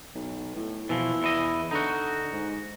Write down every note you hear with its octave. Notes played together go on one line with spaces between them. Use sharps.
B1
A2
B2 E3 F3
E2 E4 D#5
D3 D#4 F#4
G#2